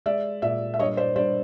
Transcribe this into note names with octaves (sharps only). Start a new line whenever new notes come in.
G#3 D5 E5
A#2 D5 E5
E5
G2 C#5 D#5
C5 D5
G2 C5 D5